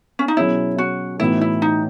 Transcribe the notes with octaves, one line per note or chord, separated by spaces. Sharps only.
C#4
D#4
B2 F#3 C#4 E4 G#4 C#5
F#4
A2 E3 B3 D#4 E4 F#4
E4
D#4